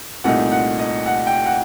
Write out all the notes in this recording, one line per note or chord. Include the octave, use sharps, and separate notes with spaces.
C2 A#2 A3 D#4 F#5
F#5
D#5
F#5
G5
F#5